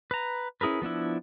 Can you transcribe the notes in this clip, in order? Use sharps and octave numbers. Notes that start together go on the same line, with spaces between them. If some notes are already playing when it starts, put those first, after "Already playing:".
B4 A#5
C#4 E4 G#4 A#4 B4
F3 B3 D4 E4